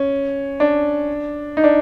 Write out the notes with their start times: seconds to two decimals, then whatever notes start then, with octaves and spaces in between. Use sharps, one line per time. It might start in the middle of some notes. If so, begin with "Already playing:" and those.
Already playing: C#4
0.60 D4
1.57 D#4
1.64 D4